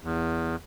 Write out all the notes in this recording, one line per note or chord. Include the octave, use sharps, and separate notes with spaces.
E2